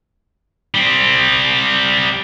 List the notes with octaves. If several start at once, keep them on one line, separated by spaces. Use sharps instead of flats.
G3 C4